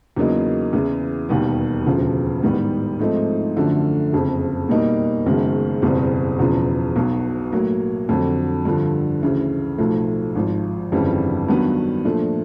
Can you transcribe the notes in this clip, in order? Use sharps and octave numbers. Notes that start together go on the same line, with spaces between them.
E2 C#3 F#3 A#3 D#4
E2 C#3 E3
E1 D#2 D#3 G3 B3
E1 D2 C#3 F3
A1 G#2 D#3 G3 B3
G#2 F3 A3 C4 D#4
F#2 D3 F3 A3 D4
F#1 F2 C#3
B2 G3 A#3 D#4
F#1 F#2 D#3 G#3 B3
F#1 E2 B2 G3 C4
E1 E2 C#3 F3
B1 B2 F#3
A2 F#3 A#3
F2 D3 F#3
G2 D3 F3
D2 C#3 E3
B1 A2 F3 A3
G#1 G#2 F3
G1 F2 C#3 E3 G3
G2 D#3 F#3 B3
A#2 F3 A3 D4